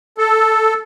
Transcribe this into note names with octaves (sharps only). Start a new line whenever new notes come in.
A4